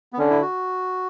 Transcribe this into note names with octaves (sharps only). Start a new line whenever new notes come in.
B3
D3 C#4
E4
F#4